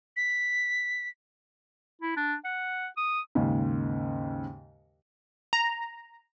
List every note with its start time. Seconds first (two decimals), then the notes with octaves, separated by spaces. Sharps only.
0.17 B6
2.02 E4
2.17 D4
2.45 F#5
2.97 D#6
3.35 D#2 G#2 C#3
5.53 A#5